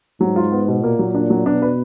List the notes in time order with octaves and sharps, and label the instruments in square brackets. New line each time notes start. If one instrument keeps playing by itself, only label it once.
[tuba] G#2 [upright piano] F#3
[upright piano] F4
B3
B2
[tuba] A#2 [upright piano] A#3
[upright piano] F#3
D4
F#3
[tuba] B2 [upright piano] D4
[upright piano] B4